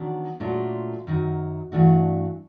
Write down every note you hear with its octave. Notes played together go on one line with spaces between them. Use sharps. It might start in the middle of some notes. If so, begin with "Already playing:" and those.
Already playing: D#3 F#3 B3 D4
A#2 F#3 A3 D4 F4
F#2 D#3 F#3
G2 E3 A3 D4 F#4